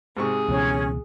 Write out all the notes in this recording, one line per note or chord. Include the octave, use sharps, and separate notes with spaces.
G#2 C3 G#4 C#6
C#2 B2 E3 C#4